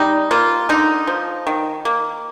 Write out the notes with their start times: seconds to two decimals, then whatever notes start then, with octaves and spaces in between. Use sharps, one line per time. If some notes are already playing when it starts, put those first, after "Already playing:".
Already playing: G3 D#4
0.31 A#3 F4
0.69 D3 D#4
1.07 F3
1.47 D#3
1.85 A#3